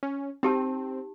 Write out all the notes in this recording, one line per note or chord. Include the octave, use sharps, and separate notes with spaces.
C#4
C4 D#4 G4 A5